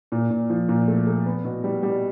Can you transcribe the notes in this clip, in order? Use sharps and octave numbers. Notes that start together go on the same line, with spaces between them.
A#2
A#2
F3
A#2
A3
A3
B3
B2
G3
G3